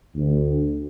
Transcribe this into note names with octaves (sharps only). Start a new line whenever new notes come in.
D2